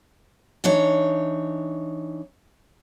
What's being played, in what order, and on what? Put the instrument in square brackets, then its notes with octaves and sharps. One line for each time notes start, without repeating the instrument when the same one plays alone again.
[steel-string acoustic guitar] E3 D4 D#4 C#5